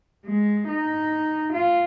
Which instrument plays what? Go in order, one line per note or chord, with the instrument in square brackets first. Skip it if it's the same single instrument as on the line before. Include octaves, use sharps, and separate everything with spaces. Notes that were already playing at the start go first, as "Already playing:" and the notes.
[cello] G#3
D#4
F4